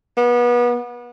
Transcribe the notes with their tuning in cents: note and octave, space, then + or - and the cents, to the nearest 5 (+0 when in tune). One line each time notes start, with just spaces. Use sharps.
B3 -30